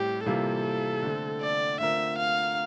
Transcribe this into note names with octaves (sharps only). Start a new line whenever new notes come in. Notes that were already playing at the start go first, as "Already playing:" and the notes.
Already playing: A2 G3 C4 G4
C3 E3 G3 A#3 F4 A4
D3 A3 C4
D5
D3 A3 C4 F4 A#4 E5
F5